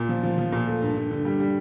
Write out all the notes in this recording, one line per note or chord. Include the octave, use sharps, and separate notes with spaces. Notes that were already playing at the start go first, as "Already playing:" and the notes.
Already playing: A#2
F3
F3
F3
A#2
A3
G2
G2
D3
G3
G3